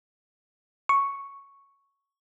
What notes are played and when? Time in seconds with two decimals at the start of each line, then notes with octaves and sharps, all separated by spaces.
0.89 C#6